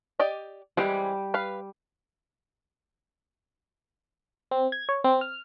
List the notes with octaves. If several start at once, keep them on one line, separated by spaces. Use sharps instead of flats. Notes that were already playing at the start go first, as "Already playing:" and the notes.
G4 D5 D#5
E3 G3 G#3 C4 G4
B4 F5
C4
G#6
C#5
C4
F6